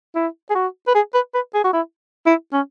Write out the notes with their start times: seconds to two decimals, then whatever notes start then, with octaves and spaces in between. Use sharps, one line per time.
0.15 E4
0.50 G#4
0.55 F#4
0.87 B4
0.95 G#4
1.14 B4
1.34 B4
1.54 G#4
1.64 F#4
1.73 E4
2.26 E4
2.53 C#4